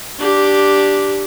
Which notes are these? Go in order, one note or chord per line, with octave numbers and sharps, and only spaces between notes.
D4 G4